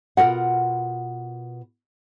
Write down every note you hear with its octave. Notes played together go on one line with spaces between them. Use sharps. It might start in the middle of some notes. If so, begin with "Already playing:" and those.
B2 F4 A4 A#4 F#5